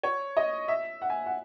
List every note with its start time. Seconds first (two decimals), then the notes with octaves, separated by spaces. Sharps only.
0.03 C#5
0.37 D#5
0.68 E5
1.02 F#5
1.10 G#5
1.26 F#5